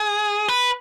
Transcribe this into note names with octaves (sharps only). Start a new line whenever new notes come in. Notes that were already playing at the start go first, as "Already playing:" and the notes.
Already playing: G#4
B4